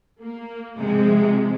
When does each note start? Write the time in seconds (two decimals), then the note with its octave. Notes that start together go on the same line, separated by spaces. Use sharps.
0.21 A#3
0.77 C3 F3 G#3